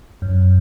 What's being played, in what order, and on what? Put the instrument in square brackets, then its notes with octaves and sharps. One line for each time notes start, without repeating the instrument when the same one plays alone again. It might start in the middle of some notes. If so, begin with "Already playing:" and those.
[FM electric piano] F#2